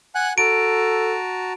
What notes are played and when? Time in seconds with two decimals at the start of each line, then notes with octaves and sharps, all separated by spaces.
0.15 F#5 G#5 F#6
0.38 F#4 A4 A5 A#5 D7